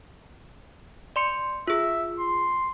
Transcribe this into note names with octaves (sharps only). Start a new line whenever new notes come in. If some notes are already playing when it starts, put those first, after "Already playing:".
D5 C6 C#7
F4 G#4 E5
C6